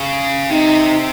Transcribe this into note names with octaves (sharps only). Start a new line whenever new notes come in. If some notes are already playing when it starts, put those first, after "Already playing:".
Already playing: C#3
C3 D#4